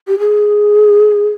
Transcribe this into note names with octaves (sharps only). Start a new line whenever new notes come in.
G4
G#4